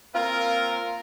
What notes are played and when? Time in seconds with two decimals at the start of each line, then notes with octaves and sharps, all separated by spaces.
0.14 A#3 C4 F4 A#4